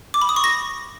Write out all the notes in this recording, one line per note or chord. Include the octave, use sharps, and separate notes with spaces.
D6
B5
D#6
C#6
A#6